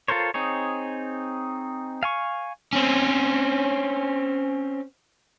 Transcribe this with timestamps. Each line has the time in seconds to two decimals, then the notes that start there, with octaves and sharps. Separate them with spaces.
0.08 F4 A4 A#4 C5 C#5
0.34 C4 D#4 G#4 C#5
2.03 F5 G#5 C#6
2.73 C4 C#4